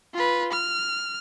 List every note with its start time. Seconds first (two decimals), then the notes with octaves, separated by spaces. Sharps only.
0.14 F4 B4
0.53 F6